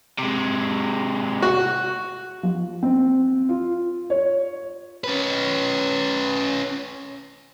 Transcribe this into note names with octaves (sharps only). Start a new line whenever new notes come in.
C3 G#3
F#4
F3
C4
F4
C#5
C#4 B4